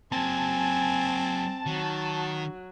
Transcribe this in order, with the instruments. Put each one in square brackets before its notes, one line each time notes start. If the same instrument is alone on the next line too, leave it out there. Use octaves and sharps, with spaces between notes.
[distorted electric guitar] F#3 A#3 [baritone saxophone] C4 [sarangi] G#5 [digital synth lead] A5
[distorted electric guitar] D#3 [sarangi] F#3